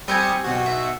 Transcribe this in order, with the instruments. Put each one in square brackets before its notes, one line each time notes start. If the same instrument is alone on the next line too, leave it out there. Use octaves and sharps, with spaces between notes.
[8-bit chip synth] G3 D#6 C#7 [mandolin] C4 G4 G#5
[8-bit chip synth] B1 B2 F#4
[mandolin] E5